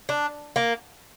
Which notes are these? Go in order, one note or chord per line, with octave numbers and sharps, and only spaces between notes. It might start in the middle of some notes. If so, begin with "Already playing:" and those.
D4
A#3